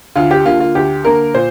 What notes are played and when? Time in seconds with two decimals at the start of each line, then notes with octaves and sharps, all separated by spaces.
0.16 D2 F4
0.31 G4
0.45 D3 A#3 F4
0.60 F4
0.75 D2 G4
1.05 D3 A#3 A#4
1.34 A#2 C5